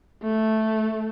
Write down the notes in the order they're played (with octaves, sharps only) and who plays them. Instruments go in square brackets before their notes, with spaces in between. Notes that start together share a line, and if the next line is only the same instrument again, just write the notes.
[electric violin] A3